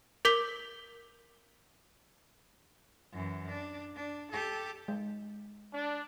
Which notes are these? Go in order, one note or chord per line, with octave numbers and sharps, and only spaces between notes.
A#4 D6 G6 B6 G7
F#2 E3
D4
D4
G4 A4
G#3
D4